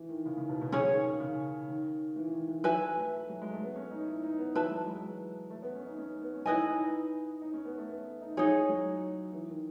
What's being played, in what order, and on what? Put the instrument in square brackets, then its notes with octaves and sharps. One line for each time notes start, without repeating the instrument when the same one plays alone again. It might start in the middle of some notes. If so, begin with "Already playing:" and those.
Already playing: [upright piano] E3
D#3
C#3
C#3
B2
B2
[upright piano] C#3 [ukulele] C#4 G#4 C#5
[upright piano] D#3
C#3
C#3
D#3
E3
D#3
E3
[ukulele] B4 E5 G#5
[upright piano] A3
F#3
G#3
A3
B3
C#4
D#4
E4
D#4
B3
[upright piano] E3 [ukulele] B4 E5 A5
[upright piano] F#3
G#3
A3
B3
C#4
D#4
C#4
B3
C#4
[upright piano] D#4 [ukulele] E4 B4 D#5 G#5
[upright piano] D#4
D#4
C#4
B3
A3
B3
D#4
[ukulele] D#4 G#4 C#5 [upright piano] E4
[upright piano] F#3
E3
D#3